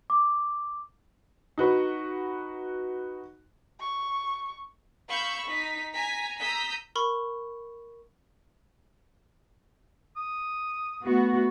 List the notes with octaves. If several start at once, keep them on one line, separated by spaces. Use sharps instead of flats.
D6
D#4 F#4 B4
C#6
F5 B5 C#6 E6 G6
D#4 B6
G#5 A#5 B6
A#5 D#6 E6 G6 B6
A#4 B5 C#6
D#6
A3 B3 F#4